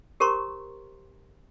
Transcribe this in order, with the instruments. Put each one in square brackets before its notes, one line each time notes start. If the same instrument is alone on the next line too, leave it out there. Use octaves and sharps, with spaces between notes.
[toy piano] G4 A#4 C5 A#5 C6 C#6